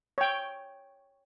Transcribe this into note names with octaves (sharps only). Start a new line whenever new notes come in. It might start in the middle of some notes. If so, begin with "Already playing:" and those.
C#5 G5